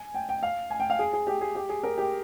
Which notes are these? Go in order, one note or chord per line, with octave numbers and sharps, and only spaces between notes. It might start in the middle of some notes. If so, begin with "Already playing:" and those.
Already playing: G#5
G5
G5
F5
G#5
G5
F5
G#4
G#4
G4
G#4
G4
G#4
A#4
G4